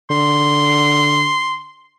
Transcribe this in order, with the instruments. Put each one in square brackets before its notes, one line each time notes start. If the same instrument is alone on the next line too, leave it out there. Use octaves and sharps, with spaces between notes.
[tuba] D3 [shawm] C6